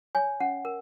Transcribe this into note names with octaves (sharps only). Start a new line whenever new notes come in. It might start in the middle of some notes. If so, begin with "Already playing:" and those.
C#5 G#5
C#4 F#5
A#4